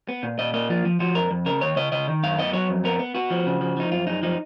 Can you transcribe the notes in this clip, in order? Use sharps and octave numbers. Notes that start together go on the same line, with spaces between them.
B3
A#2
A#2 D#5
A#3 D#5
F3 F4
F3
F3 F#4
F2 A#4
F2
C#3 A#4
D#2 C#5
C#3 D#5
C#3 D#5
D#3
F#2 F5
B3 D#5
F#3 C#5
F2
B3 A#4
B3
B3 F#4
F3
C#3
F3
F3 D#4
F#2 F4
F#2 D#4
F3 D#4